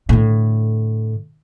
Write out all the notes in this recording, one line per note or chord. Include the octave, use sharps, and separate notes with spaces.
A2 D3